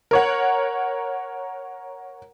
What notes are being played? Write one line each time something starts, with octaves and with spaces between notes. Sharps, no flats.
A#4 C#5 F#5